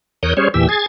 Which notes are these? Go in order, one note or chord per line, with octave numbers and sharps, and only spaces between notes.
E2 A#4 C#5 D#6 F#6 G6
G3 C#4 G#4 C5 C#5
E2 A#2 E3 G4 E6
G#4 G#6 A6